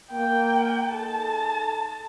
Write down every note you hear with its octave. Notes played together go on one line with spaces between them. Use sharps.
A#3 G5
D#4 G#4 A4 A5